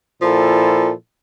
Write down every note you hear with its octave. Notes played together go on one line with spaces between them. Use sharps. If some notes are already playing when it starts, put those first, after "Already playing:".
A#2 F3 E4 A4